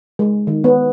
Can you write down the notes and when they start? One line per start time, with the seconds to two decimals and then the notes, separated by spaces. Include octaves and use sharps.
0.19 G#3
0.47 D#3
0.64 B3